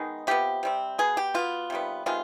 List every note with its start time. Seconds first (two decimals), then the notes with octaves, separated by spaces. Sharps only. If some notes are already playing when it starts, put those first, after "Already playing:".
Already playing: D#3 G#3 B3 D#4
0.27 C3 F3 B3 G4
0.63 C3 G3 C4
0.98 B2 B3 G#4
1.17 G4
1.34 B2 B3 F4
1.70 C3 D#3 G3 B3
2.06 C3 D#3 G#3 B3 F4